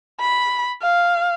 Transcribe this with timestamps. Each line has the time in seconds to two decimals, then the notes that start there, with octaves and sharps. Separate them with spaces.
0.20 B5
0.82 F5